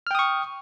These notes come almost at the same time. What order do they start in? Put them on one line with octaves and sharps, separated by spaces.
F6 G5 D#6 C#6